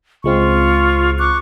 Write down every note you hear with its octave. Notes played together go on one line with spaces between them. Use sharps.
C#2 G#3 C4 F4 C#6
C#6 D6 F#6